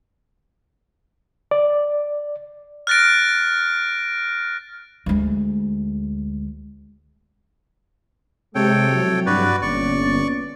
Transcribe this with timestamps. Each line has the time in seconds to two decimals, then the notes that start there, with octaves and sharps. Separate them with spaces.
1.51 D5
2.87 F6 F#6 A6 A#6 D7
5.06 D2 G#3
8.55 C3 G#3 A4 C#5 G5
8.89 F2 A2 F#3
9.26 G2 F#4 B4 D5
9.62 G1 A#2 B3 C#4 D5 C#6